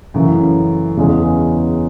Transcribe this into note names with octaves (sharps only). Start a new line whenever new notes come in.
F#2 C#3 E3 A3
E2 C#3 G#3 C#4